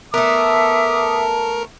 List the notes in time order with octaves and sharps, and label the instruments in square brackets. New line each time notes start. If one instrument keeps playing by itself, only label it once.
[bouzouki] A3 B3 [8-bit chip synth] A#4 [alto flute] E5 [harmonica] D6 D#6